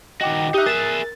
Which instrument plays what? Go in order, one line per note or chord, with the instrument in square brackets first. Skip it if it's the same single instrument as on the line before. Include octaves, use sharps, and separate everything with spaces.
[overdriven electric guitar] D#3 F#4 [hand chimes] D#5 G5 D6
[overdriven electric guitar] D#4 [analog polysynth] G4 E5 [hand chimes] D#6 F#6
[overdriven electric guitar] G#4 E5 [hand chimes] A#4 [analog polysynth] A6